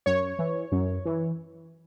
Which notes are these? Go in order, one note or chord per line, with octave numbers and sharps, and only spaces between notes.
F#2 C#5
E3
F#2
E3